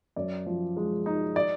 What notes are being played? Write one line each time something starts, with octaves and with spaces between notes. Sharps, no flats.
F#2 D5
F3
G#3
D#4
D5